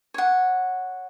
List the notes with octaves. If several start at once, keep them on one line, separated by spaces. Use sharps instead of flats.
C#5 F#5